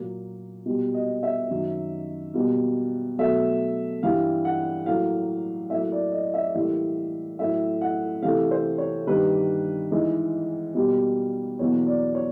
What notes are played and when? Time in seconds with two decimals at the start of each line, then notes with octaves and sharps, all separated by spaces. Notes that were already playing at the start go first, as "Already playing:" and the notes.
Already playing: A#2 F#3 A#3
0.66 B2 G3 A#3
0.94 D#5
1.23 E5
1.51 F#2 D#3 F#3
2.34 B2 G3 A#3
3.18 B2 F#3 A3 E5
4.03 G2 E3 G3 F5
4.45 F#5
4.86 A2 F#3 A#3 F5
5.70 A2 F#3 A#3 E5
5.92 D5
6.12 D#5
6.34 E5
6.54 A2 E3 G3 A#3 E5
7.39 A2 F#3 A3 E5
7.81 F#5
8.22 C3 E3 A3 F5
8.51 C5
8.78 C#5
9.07 G2 D#3 G3 A#3 B4
9.91 G#2 E3 G#3
10.75 B2 G3 A#3
11.59 E2 B2 F#3 A#3 C#5
11.87 D5
12.15 C#5